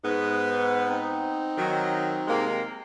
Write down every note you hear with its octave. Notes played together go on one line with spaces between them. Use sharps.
G#2 B3
C4 D#4
D#3 F#3
C3 G#3 A#3